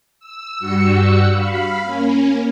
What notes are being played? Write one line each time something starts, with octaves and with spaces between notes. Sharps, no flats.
E6
G2 G3 F#4 E6 C#7
F5 B5
A#3 C#4